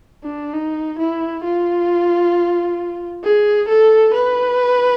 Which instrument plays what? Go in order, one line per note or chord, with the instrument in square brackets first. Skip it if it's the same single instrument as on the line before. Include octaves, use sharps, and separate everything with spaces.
[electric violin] D4
D#4
E4
F4
G#4
A4
B4